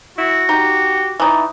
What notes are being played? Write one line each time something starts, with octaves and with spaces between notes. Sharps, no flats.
E4 F#4
D#4 G4
E3 D#4 D5